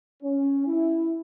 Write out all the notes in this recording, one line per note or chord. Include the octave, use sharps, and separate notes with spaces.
C#4
E4